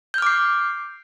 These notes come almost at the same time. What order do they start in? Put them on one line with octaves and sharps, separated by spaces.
G6 F6 D6 C7